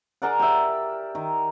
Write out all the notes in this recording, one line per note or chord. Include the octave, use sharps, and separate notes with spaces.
G#4 A#4 D5 F#5
G4 E5
D#3